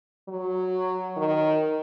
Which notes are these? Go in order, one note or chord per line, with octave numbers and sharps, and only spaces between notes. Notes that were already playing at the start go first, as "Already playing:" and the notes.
F#3
D#3